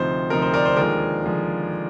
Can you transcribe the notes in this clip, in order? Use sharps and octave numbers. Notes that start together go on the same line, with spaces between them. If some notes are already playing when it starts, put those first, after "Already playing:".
Already playing: D2 C3 F3 C4 D#4 C5
D2 C3 F3 C4 D#4 A#4
C5
A#4 D5
C5
D#2 D3 F3 G#3 A#4
D3 F3 G#3